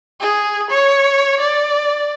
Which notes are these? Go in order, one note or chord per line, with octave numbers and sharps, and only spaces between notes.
G#4
C#5
D5